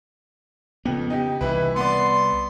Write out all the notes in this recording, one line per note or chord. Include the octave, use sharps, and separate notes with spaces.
F2 C#3 B3
D#4 G4
C2 E3 E4 B4
B3 D5 C6